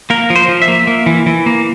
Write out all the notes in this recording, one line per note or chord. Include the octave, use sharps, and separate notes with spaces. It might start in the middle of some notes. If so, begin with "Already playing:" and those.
A#3 A#4
F3
C5
F3
E5
A#3
A#3
E3
E3
A#3